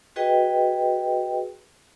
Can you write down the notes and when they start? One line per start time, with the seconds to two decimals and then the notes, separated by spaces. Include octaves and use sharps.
0.16 F#4 G#4 B4 D#5 G5